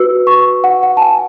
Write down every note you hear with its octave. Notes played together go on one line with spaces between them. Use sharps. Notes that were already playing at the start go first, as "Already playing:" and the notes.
Already playing: F#4 B4 E6
C#6
F#5
F#5
A5
G#5